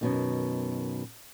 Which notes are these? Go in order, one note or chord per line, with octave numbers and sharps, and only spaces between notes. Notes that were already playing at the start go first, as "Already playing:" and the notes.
F#2 B2 D#3